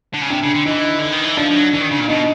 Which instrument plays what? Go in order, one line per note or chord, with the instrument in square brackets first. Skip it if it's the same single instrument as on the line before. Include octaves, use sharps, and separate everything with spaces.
[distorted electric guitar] D3
C#3
[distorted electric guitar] C3 [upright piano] D4
[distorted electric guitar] C#3
D3
[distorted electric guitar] E3 [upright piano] D#4
[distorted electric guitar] D3
D#3
E3
[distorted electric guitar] F3 [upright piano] D4
[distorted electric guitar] F3
F#3
[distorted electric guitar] E3 [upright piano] D4
[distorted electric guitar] D#3
C#3
A#2
[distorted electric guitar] B2 [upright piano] D#4